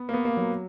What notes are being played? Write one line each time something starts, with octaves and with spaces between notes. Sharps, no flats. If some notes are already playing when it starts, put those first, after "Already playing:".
Already playing: B3
A#3
B3
A#3
F#3